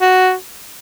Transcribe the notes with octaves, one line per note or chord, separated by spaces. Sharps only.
F#4